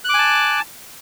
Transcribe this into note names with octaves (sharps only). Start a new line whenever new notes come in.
G#5 A5 D6 F#6